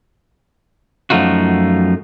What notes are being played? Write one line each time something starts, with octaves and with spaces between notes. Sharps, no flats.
F#2 F3 A3 D#4 F4 F#4